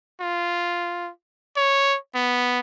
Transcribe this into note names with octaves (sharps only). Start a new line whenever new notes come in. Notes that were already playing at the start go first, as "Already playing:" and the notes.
F4
C#5
B3